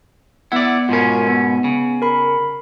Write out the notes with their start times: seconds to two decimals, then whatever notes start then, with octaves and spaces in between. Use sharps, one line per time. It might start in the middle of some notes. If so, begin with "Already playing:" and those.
0.52 B3 E4 D5 F#5
0.89 G#2 B2 C#4 F4 A#4
1.27 B3
1.64 C#3
2.02 A#4 B5